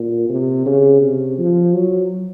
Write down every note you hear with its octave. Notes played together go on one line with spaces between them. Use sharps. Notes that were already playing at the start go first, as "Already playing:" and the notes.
Already playing: A#2
C3
C#3
C3
F3
F#3